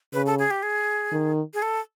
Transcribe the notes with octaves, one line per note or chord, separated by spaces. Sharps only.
C#3 B4
A4
G#4
G4
G#4
D#3
G#4
A4